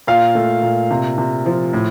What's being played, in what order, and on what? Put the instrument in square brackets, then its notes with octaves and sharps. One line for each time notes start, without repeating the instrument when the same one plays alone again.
[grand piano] A#2 F5
A3
A#2
C3
C3
F3
A2